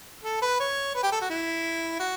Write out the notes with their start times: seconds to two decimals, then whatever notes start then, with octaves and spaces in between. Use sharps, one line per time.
0.24 A4
0.42 B4
0.60 C#5
0.95 B4
1.03 G4
1.12 A4
1.21 F#4
1.30 E4
1.99 F#4